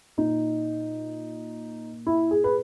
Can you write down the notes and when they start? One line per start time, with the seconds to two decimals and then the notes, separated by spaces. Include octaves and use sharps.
0.18 A#2 D#4
2.06 E4
2.31 G#4
2.44 B4